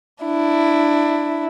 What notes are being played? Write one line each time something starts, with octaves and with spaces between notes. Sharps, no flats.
D4 E4